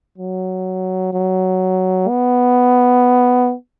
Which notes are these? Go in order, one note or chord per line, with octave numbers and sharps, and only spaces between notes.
F#3
F#3
B3